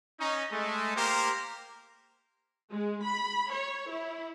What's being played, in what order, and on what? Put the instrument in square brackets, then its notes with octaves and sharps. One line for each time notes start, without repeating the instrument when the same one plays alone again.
[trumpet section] C#4 D#4
G#3 A3
A#3 G4 A#4 C5
[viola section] G#3
B5
C#5
E4